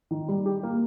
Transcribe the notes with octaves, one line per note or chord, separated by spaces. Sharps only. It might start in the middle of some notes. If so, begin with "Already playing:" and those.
D#3
G3
G4
A#3